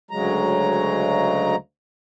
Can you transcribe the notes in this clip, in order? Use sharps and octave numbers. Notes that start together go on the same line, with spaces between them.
D2 C#3 F#3 G#3 A#5